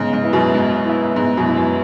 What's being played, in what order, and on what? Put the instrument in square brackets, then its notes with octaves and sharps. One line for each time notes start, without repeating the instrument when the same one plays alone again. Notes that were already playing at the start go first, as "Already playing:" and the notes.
Already playing: [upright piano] G#2 C#3 [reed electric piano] B3
[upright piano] G#2
[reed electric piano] E4 B4 E5
[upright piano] F#2 B2
[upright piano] G#2 [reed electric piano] B3
[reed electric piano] E4 B4 E5
[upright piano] G#2 [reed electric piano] B3
[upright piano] F#2 B2
[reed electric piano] E4 B4 E5
[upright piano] F#2